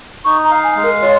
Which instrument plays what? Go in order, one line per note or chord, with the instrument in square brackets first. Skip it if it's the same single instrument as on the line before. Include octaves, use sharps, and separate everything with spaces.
[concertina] D#4 [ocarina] C#6
[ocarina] A#5
[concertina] F5
[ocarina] G#5
[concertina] G#3
[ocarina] A#4
[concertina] F4 [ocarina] C#5